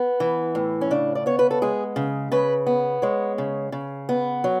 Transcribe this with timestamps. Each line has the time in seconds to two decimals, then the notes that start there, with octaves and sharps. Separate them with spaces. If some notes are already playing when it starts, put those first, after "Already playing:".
Already playing: B3
0.20 E3
0.55 A2
0.81 C#4
0.91 C#3 D4
1.15 D5
1.26 B3 C#5
1.39 B4
1.51 A4
1.62 G#3 G#4
1.96 C#3
2.32 C#3 B4
2.66 B3
3.02 G#3 C#5
3.38 C#3
3.72 C#3
4.09 B3
4.44 F#3